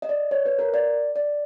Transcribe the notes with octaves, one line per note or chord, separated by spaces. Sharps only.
D#5
D5
C#5
B4
A#4
D5
D5